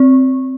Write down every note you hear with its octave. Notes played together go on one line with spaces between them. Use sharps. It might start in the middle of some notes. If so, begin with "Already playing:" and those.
Already playing: C4